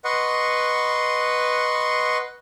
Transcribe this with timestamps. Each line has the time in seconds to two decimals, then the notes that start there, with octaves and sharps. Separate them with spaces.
0.05 B4 D#5 F#5 C6 C#6